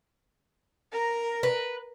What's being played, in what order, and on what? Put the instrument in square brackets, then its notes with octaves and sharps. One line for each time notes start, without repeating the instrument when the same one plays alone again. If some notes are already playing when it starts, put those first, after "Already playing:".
[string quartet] A#4 A#5
[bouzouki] B4